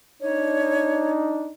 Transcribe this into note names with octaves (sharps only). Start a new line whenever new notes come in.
D4 D#4 C#5